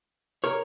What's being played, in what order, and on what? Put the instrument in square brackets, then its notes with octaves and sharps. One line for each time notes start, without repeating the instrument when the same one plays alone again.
[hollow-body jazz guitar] A#4 C#5